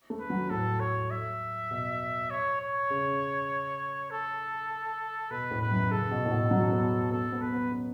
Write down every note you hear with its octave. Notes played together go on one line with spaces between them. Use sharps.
A3
B4
F#3
A2 A4
C#5
E5
B2
C#5
C#5
C#3
A4
B2 B4
A2
B4
F#2
C#3 A4
B2
A2
B2
F#3
B3
B3 A4
B3
B4
B3
C#4